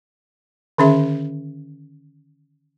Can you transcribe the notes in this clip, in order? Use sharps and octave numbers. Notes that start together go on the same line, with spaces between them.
D3 D#3 C#4 G#4 E5